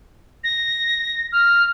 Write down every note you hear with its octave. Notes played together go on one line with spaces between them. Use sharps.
A#6
F6